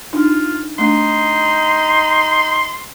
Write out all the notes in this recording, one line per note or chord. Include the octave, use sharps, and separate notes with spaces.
D4 D#4 F4
A3 A#3 D4 D#4 C6